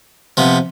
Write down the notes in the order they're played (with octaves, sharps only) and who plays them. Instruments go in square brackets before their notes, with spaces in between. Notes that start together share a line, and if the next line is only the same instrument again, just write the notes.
[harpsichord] C3 F3 B3